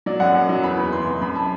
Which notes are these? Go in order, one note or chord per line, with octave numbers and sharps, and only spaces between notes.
F#3 D5
F#2 F#5
F#2
F#3
E2 B5
E2
E3 C6
C3
F#2 B5
A5